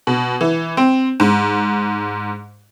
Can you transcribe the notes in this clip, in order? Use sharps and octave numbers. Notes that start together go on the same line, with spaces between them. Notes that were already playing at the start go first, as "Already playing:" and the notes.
B2
E3
C4
G#2